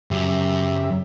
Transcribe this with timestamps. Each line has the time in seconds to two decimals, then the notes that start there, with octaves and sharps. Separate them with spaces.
0.11 F#2 C#3 G4 E5